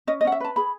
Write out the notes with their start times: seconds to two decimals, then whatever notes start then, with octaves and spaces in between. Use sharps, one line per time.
0.07 C#4 D#5
0.21 D#5
0.25 C#4 F#5
0.32 E5
0.40 B4 A5
0.56 G#4 B5